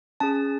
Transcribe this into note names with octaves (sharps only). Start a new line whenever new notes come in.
C#4 G#4 A5